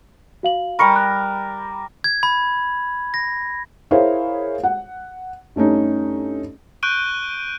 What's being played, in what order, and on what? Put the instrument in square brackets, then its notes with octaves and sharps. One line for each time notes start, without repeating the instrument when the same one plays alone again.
[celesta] F#4 F5 F#7
[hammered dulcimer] G3 A#4 [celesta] B5 C#6 C#7
[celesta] F#6
[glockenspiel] G#6
B5
A#6
[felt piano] E4 G#4 A#4 C5 C#5 F5
F#5
G2 A3 C#4 D#4
[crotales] C#6 F#6 G6 D7 D#7 G7